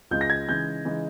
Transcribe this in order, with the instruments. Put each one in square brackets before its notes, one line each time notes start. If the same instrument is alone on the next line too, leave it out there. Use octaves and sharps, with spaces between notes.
[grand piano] C#2 C#3 G#3 G6
A#6
G#6
C#3 E3 G#3 D#4 G6
C#3 E3 G#3 D#4